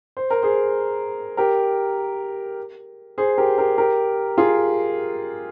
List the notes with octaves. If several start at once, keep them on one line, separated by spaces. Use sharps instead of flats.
C5
A#4
G#4 C5
G4 A#4
G#4 C5
G4 A#4
G4 A#4
G4 A#4
F4 G#4